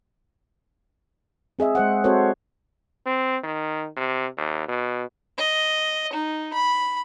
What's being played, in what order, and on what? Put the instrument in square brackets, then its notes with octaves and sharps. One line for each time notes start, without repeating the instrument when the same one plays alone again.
[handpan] C4 G#4 D#5 E5
G#3 C5 F#5
C4 F#4 A4 C5 C#5
[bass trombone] C4
D#3
C3
D#2
B2
[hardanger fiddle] D#5
D#4
B5